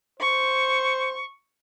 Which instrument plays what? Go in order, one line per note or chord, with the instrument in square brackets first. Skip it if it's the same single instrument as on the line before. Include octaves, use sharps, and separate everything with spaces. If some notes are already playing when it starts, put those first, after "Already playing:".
[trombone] C5 [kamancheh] C#6